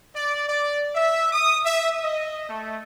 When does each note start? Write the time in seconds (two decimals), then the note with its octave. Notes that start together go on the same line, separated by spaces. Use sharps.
0.15 D5
0.48 D5
0.95 E5
1.32 D#6
1.65 E5
2.02 D#5
2.48 A3